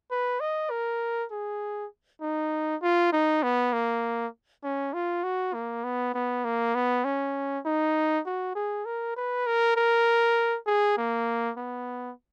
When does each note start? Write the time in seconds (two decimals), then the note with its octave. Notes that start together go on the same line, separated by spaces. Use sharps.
0.11 B4
0.40 D#5
0.70 A#4
1.32 G#4
2.22 D#4
2.82 F4
3.12 D#4
3.43 B3
3.73 A#3
4.64 C#4
4.93 F4
5.24 F#4
5.54 A#3
5.84 B3
6.14 B3
6.45 A#3
6.75 B3
7.05 C#4
7.65 D#4
8.26 F#4
8.55 G#4
8.86 A#4
9.16 B4
9.47 A#4
9.76 A#4
10.67 G#4
10.97 A#3
11.57 B3